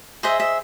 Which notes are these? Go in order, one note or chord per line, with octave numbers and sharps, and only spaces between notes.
G#4 C5 D#5 E5
E5